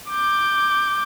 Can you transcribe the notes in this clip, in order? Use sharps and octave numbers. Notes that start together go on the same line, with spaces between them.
D6 G6